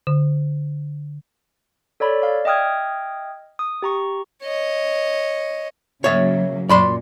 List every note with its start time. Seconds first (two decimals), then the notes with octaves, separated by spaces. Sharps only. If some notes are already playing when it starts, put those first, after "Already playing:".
0.07 D3
2.00 A4 C#5 D5 B5
2.22 D5 F5
2.45 D#5 E5 G5 D#6 F6 G#6
3.59 D#6
3.82 G4 A#5 C#6
4.43 C#5 D#5
6.04 C#3 F#3 A#3 C#5 E5
6.69 F#2 A#2 D5 B5 C6